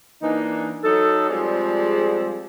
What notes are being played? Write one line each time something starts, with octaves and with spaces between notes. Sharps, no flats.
E3 A#3 D4 D#4
F#3 D#4 A4
F3 G3 G#3 C4 G#4 D5